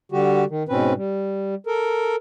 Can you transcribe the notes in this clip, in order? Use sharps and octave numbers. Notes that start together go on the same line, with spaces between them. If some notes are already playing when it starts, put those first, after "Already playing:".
D3 G3 F#4 G4
D#3
G#2 B2 C4 C#4 B4
G3
A4 A#4